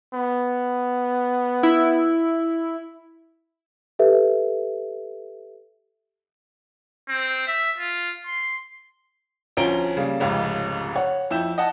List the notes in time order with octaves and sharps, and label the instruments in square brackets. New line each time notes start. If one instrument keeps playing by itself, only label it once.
[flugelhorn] B3
[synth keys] E4
[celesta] G4 A4 B4 E5
[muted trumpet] C4
E5
F4
C6
[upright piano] D2 F3 C#4 A#5 D7 G7
C#3 G3 A#3
F1 C#2 G#2 C#3
C#5 F#5
F2 E4 G6 E7
D#5 F#5 A5